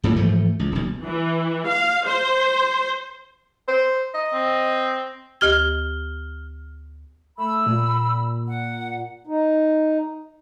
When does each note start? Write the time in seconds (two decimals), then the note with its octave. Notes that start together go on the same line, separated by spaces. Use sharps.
0.04 F#2 A2 G3
0.16 G#2 E3 F3 A3
0.59 C#2
0.72 D#1 B1
1.02 E3
1.66 F5
2.06 C5
3.68 C5
4.14 D#5
4.33 C4
5.41 D2 G4 F6 G#6 G7
7.38 A3 B5 E6
7.66 A#2
8.46 F#5
9.27 D#4